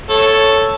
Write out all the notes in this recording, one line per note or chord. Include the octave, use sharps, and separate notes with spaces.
A4 C#5